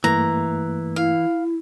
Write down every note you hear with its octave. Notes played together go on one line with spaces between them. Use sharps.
G2 E3 A3 A#3 A#5
E4 F5